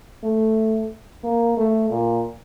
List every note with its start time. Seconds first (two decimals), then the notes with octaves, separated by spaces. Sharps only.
0.23 A3
1.24 A#3
1.57 A3
1.90 A#2